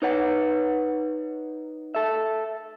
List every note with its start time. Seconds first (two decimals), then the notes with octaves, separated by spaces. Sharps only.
0.02 D#4 B4 C#5 F#5
1.95 A4 E5